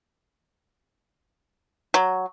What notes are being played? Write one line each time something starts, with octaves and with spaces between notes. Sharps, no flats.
F#3